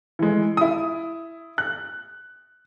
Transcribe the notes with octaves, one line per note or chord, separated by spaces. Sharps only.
E3 G#3
E4 D#6
F#6